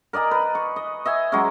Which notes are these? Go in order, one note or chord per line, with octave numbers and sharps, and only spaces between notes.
A#4 D5 D#5 G#5
B4
C#6
D#5
D#5 E5 G#5
F#3 G#3 C#4